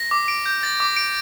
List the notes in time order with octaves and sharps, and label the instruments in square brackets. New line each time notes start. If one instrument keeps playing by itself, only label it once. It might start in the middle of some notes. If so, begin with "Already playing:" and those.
Already playing: [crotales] A#6
D6
D7
G6
A6
D6
D7